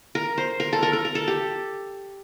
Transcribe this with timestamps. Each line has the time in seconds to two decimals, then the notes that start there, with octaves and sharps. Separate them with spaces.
0.15 A#4
0.38 C5
0.60 A#4
0.73 A4
0.83 A#4
0.93 A#4
1.05 A#4
1.15 A4
1.28 G4